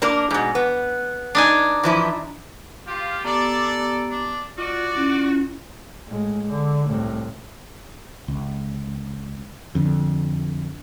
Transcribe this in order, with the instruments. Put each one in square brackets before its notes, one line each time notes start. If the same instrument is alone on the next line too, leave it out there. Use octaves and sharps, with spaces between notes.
[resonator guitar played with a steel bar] A#3 D4 A#4
G#2 B2
B3
[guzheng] D4 D#4 G#5
[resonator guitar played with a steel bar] E3 F3 E4
[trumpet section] F4 [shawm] G4
[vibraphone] B3 G4 A#5 [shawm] D4 [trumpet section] A4 D5
[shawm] D4
[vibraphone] F4 [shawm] F#4 [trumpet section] D5
[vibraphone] C#4 E4 F4
[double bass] A2 G#3
D3
C2 A2
[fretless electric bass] C#2
F2 D3